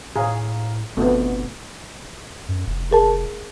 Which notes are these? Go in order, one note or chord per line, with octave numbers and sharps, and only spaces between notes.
A2 G#4 C#5 F5 A#5
G1 F2 B2 D3 A3 B3
F#2
F1
G#4 A#4 A5